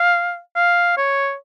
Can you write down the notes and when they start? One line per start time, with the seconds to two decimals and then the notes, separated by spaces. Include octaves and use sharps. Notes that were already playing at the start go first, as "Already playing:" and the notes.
Already playing: F5
0.56 F5
0.97 C#5